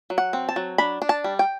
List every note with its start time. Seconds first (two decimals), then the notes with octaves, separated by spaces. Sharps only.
0.10 F#3
0.18 F#5
0.33 C4
0.49 A5
0.56 F#3
0.78 D4 B5
1.02 D4
1.09 A5
1.24 G3
1.39 G5